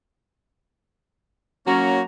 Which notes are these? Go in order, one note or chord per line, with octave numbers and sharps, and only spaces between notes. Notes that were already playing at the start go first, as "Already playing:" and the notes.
F#3 A#3 C#4 F#4 A#5